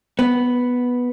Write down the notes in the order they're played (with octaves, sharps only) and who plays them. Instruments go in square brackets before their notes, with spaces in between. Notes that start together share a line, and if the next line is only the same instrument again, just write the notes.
[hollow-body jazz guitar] B3